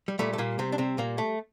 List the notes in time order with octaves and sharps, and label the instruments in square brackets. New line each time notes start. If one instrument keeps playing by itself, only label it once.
[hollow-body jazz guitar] G3
A#2 G3 A3
A3
A#2 A#3
C3 C4
D4
C3 C4
A#2 A#3
A3